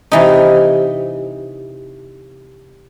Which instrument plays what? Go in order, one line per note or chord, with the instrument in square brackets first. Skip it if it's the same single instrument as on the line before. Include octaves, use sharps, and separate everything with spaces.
[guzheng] C3 E3 D#4